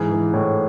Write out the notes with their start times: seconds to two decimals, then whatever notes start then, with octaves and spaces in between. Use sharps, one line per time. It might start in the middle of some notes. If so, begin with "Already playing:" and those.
Already playing: G#2 E3 G#4
0.11 E3
0.34 A2